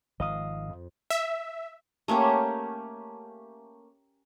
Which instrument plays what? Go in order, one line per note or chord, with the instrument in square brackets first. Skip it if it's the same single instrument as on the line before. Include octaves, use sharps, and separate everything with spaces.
[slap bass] G#1 D#3 F3 [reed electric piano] D#5 F5 D#6
[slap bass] F2
[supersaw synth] E5
[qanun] A3 A#3 C#4 G4